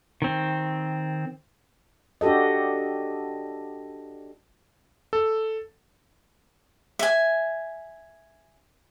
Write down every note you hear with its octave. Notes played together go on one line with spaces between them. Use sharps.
D#3 C4
D4 F#4 G4 A4 D#5
A4
E5 G#5